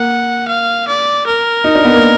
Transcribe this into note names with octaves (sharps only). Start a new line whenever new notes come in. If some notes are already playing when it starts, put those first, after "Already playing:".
Already playing: A#3 F#5
F5
D5
A#4
D#4
D4
B3
A#3